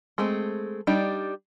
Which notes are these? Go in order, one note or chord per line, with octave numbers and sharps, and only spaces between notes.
G#3 A3 C4
G3 D4 D#4 G4